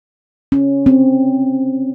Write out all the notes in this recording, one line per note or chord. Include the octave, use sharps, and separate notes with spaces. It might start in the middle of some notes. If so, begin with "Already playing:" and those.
C#4
C4